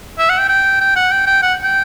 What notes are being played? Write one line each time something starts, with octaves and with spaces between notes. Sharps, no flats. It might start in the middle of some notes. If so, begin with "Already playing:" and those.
E5
F#5
G5
G5
G5
F#5
G5
G5
F#5
G5